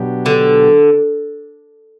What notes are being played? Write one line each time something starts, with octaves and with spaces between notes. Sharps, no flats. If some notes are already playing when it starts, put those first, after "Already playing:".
Already playing: B2 F#3 B3 D4 G4
D3